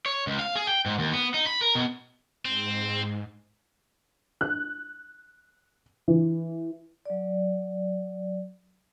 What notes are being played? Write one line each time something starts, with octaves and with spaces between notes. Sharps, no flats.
C#5
C#2
F5
G#4
G5
G#2
D#2
B3
D#4
B5
A#4
B2
G#2 C4
F#6
E3
F#3 D5